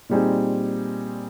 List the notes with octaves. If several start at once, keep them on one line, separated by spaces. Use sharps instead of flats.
A#2 G3 C4 D#4 G#4